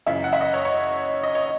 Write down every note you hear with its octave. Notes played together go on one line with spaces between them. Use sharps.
F#2 C#3 E3 E5
F#5
E5
D#5
C#5
C#5
D#5
C#5